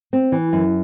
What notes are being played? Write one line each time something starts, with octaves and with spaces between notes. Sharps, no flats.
C4
E3
F#2